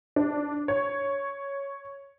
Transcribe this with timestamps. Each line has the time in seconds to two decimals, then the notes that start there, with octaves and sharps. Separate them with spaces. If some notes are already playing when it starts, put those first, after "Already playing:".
0.16 D4
0.68 C#5